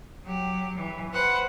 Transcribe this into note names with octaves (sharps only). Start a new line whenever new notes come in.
F#3 G4
E3
B4 C5 F#5